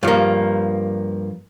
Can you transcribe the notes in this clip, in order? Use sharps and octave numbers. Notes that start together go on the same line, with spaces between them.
G2 F3 A#3